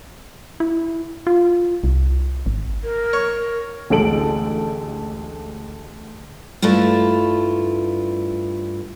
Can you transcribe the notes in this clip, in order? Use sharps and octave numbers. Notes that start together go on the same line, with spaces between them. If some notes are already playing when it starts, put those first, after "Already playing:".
E4
F4
C2
G#1
A#4
C#5
A1 D2 G#3 A4 D7 F#7
G2 A3 E4 F4